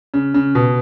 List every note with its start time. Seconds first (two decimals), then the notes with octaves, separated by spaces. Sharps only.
0.14 C#3
0.34 C#3
0.55 B2